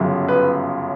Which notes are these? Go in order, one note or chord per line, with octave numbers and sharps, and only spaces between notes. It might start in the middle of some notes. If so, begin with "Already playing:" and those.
Already playing: G1 F#2 C#3 F#3
B4